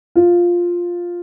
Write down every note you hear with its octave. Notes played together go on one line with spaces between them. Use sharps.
F4